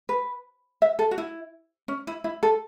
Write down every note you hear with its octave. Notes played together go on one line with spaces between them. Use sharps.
B4
E5
A4
F#4
E4
C#4
E4
E4
A4